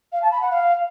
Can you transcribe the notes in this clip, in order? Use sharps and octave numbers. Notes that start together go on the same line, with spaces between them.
F5
A5
B5
F#5
F5